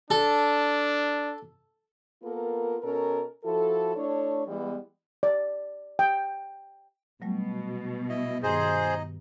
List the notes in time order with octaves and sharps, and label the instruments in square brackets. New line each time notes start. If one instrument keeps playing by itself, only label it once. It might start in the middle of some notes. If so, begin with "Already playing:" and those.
[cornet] D4 [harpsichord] A4
[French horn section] A#3 B3 F4 A4 A#4
B2 C#4 A4 A#4
F3 E4 F#4 A4
A3 D4 E4 A4 C#5
E3 G3 G#3 B3
[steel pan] D5
G5
[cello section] B2 [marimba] F#3 G3 A3
[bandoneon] E4 D#5
[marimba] G2 D#3 [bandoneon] D#4 D#5 [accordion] G#4 C5